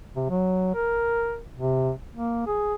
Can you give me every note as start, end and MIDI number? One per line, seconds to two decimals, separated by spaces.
0.16 0.26 48
0.30 0.72 54
0.75 1.39 70
1.55 1.92 48
2.14 2.43 58
2.46 2.75 68